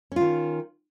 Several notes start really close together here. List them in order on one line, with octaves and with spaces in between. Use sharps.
C#4 F4 D#3